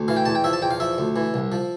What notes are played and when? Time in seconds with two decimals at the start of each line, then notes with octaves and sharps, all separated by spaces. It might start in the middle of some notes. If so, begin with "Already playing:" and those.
Already playing: D2
0.08 E3 F5
0.17 G5
0.26 E2 A5
0.35 G5
0.44 F3 E5
0.53 A5
0.62 E2 G5
0.71 F5
0.80 F3 E5
0.98 D2
1.16 E3
1.34 C2
1.52 F3